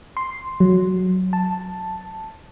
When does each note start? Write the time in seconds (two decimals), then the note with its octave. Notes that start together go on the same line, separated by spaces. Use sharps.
0.17 C6
0.60 F#3
1.33 A5